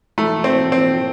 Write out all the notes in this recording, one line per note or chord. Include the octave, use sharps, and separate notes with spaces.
A3
C4
C4